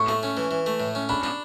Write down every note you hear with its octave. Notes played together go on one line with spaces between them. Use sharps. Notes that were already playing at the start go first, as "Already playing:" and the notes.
Already playing: A2 C#6
A3
C#4
E3
E3
A3
A2
C#4
D4 B5
D4